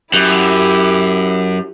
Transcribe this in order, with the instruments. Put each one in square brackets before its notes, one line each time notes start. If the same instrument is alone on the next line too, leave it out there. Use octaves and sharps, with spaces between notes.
[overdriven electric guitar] F#2 [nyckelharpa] E4 G4